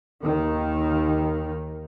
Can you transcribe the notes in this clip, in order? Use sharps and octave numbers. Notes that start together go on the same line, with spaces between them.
D#2 D#3